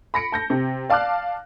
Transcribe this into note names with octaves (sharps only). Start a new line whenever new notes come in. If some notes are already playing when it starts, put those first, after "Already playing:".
B5 A#6 C#7 D7
A5 G6 A#6
C3
D5 F5 A5 D6 F6 F#6